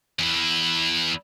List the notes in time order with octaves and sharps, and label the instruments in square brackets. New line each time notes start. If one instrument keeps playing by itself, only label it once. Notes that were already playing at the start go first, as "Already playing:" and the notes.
[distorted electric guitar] E2 E4